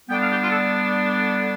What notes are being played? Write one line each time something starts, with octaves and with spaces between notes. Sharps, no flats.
D3 G3 B3 D4 G5
F5
G4
F4
A4